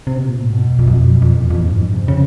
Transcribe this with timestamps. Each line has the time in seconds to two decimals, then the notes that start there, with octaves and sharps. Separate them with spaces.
0.07 C3
0.18 B2
0.28 A#2
0.40 A2
0.50 G#2 B2
0.64 F2
0.79 F2
0.88 F#2
0.93 F2
1.08 F#2
1.22 F2
1.36 E2 A#2
1.50 F2
1.60 E2
1.65 F2 G#2
1.79 G2
1.94 F2 C3
2.08 C#3